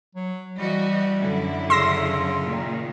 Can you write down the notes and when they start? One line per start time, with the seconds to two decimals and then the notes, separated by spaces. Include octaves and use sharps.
0.15 F#3
0.57 E3 G3 F#4 D#5
1.19 F#2 D3 E4
1.70 C#3 C6 E6 A#6
2.43 A#2 D#3